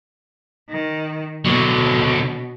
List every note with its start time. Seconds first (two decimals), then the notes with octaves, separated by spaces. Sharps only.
0.70 D#3
1.45 B2 D3 F#3